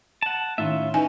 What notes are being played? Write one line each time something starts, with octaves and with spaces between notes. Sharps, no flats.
F#5 A5
A2 D#3 C#4 F4 E5
E3 C#4 D#4 B4 G#5